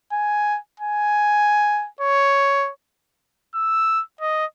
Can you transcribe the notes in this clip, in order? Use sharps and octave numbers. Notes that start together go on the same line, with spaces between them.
G#5
G#5
C#5
E6
D#5